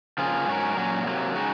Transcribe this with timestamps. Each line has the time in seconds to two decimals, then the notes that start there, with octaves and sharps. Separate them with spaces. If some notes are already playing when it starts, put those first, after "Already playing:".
0.18 C#3 F3 A#3 F4 G#4
0.48 G#2 F#3 C#4 F#4 A#4
0.77 A#2 F#3 C#4 F#4
1.06 C3 F#3 A#3
1.35 C#3 G#3 D#4 F#4